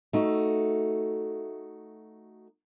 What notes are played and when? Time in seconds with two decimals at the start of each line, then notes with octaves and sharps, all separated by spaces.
0.13 A3 D#4 F#4